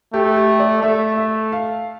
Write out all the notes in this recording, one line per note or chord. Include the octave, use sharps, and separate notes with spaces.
A3 G4
G4
D5
A3 E5
E5
F5